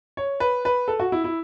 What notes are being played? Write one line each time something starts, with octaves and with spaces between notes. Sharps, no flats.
C#5
B4
B4
A4
F#4
E4
E4